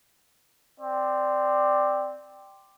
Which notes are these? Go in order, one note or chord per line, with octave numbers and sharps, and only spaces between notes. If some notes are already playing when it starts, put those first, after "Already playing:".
C4 D5